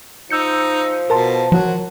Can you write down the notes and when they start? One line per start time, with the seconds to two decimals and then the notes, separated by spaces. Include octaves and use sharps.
0.30 F3 D#4 E6 G6 C#7
1.10 B2 A#4 A5 C6
1.52 F3 F#3 F#4